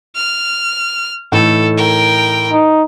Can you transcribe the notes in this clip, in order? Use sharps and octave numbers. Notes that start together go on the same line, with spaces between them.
F6
A2 E3 D#4 A4
A#4 G5
D#4